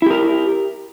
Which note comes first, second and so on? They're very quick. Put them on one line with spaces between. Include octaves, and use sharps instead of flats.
E4 G4 A#4